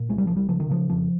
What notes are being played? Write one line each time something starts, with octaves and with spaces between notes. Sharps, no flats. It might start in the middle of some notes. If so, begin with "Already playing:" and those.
Already playing: A#2
C2 G#3
G3
C2 F3
G3
C#3 F3
D#3
C#3 F3
F2 F3